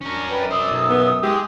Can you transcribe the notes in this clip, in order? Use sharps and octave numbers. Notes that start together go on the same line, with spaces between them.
C#4 D4 A#4
F#2 B4 D5 G5
C5 D5 D#6 E6
B1
B3
G#3 G4